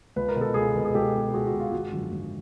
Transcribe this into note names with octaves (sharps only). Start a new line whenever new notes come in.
C#2 B4
A#4
B2
A4
C#2 G#4 A#4
B2
G#4
C#2 G4 A4
B2
C#2 F#4 G#4
F#4
B2
F4
G#1 F#4
F#2 D3 F3
G#1